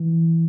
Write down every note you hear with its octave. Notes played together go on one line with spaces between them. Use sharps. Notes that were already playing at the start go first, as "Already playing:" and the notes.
Already playing: E3